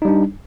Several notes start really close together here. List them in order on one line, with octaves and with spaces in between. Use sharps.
D#4 G3 D4